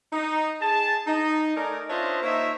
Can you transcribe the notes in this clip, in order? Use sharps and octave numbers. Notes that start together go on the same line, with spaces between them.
D#4
G#4 A5
D#4
A3 D#4 A#4 D5 G#5 A#5
D4 F4 C5 C#5 D#5 E5
A#3 D#4 A#4 C5 C#5 E5